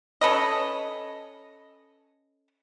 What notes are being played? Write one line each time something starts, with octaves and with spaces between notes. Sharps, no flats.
C#4 A4 B4 D#5